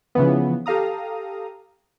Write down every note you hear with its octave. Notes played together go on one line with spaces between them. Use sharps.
C#3 E3 F3 B3
G4 A4 F5 A#5 D#6